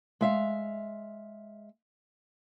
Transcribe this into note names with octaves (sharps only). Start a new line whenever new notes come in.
G#3 E5 F5